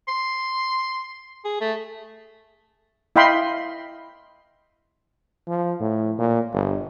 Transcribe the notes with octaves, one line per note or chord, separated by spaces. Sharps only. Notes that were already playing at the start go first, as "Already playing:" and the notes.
C6
G#4
A3
E4 D#5 F5 G5 B5 C6
F3
A2
A#2
G1